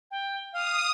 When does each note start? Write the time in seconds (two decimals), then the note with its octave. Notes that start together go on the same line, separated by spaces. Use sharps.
0.11 G5
0.53 F5 D#6